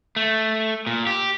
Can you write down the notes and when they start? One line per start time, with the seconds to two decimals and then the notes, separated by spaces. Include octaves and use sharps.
0.16 A3
0.87 A#2
1.07 G4